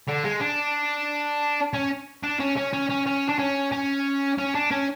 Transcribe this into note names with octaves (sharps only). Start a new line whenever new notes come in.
D3
G#3
D4
C#4
D4
C#4
C#4
C#4
C#4
C#4
D4
C#4
C#4
C#4
D4
C#4